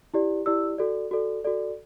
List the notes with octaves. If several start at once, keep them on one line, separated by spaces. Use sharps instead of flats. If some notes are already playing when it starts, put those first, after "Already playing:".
E4 G4 D5
E4 G4 D5 E6
F#4 A4 D5
F#4 A4 D5
F#4 A4 D5